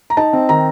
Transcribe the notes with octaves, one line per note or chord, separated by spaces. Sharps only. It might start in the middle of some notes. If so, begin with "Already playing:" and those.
A#5
D#4 A5
C4
D#3 A#5